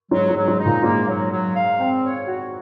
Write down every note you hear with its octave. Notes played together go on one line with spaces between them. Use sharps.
G#2 F#3
G#2
F#3
G#2
D#4
A#2
G#2 A#3
F#3
F#3
F5
C4
C#5
F#4